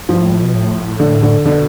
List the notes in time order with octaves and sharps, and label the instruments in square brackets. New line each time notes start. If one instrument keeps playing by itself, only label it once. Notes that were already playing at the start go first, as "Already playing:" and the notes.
[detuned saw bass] G2 [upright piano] F3
[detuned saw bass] A2
G2
A2
B2
A2
[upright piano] D3
D3
[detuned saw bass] B2 [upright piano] D3